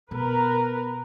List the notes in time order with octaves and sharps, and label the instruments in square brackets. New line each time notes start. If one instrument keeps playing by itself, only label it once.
[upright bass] B2 [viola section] A#4 B4